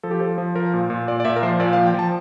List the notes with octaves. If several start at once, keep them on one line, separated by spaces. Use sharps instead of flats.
F3 A4
G4
F3 A4
F3
F3 A#4
A#2
A#2
A#2 D5
D5
A#2 E5
A#4
F3 C5
A#2 D5
F5
F3
G5
F3 A5